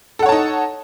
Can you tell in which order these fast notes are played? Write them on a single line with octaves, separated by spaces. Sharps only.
A4 F#5 C#5 A5 D#4